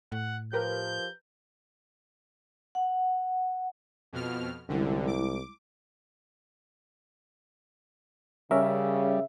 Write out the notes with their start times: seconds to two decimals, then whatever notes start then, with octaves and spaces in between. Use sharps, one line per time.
0.12 A2 F#5
0.53 F3 G4 A#4 B4 G6
2.75 F#5
4.13 F2 B2 F6
4.69 C2 F#2 D3 G3 G#3 E4
5.07 D6
8.51 C#3 G3 C#4 A#4 E5